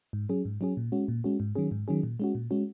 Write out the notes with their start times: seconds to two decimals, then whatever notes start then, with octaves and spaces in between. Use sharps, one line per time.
0.13 G#2
0.29 F#3 C#4 G#4
0.45 G#2
0.61 F#3 C#4 G#4
0.77 A#2
0.92 G#3 C#4 F#4
1.08 A#2
1.24 G#3 C#4 F#4
1.40 G#2
1.55 D#3 F#3 C#4 G#4
1.71 G#2
1.88 D#3 F#3 C#4 G#4
2.03 A#2
2.20 G#3 C#4 F#4
2.35 A#2
2.51 G#3 C#4 F#4